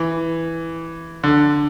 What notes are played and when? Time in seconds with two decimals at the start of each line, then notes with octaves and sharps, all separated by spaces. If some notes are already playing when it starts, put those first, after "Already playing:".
Already playing: E3
1.24 D3